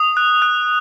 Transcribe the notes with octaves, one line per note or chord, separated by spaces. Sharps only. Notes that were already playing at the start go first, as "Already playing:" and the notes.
Already playing: D#6 F7
F#6
F#6